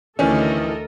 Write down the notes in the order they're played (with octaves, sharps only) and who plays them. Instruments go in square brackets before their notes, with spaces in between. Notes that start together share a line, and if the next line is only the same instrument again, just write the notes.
[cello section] D2 [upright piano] D#3 E3 [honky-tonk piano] C#4 [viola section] A4 A#4 D#5